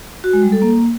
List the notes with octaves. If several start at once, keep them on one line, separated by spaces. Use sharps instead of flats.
F#4
G#3
G3
A4
A#3